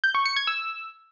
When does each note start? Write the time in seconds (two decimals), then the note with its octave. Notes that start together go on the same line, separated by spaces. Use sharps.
0.04 G6
0.15 C#6
0.26 C#7
0.36 G#6
0.47 E6